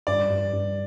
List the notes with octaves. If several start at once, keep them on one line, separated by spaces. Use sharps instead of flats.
G2 D5
G2
G2